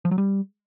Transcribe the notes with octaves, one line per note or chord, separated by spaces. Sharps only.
F3
F#3
G3